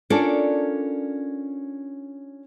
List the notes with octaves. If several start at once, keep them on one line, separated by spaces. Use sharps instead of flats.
C#4 D4 F4 A4 A#4 D5